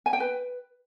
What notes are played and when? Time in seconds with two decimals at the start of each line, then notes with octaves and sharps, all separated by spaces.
0.06 G#5
0.13 G5
0.20 B4